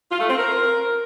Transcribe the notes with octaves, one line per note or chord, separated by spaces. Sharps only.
F4
A3
C4
A#4